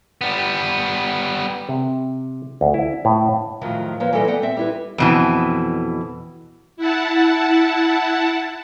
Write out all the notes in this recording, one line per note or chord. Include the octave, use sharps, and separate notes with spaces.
G3 B3
C3
D2
E4
A2
F2 A2 D#3 F3 F#3
F3 A#3 B4 C#5
E3 G3 E4 A4 D#5 G5
B3 D5 F#5 G5
C4 E5
G3 E4 B4
F2 B2 E3
E4 F#5 A5